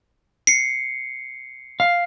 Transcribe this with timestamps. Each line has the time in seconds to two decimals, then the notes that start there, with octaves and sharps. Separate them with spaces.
0.47 C7 C#7
1.80 F5